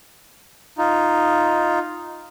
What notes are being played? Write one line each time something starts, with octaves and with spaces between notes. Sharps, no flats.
D#4 F4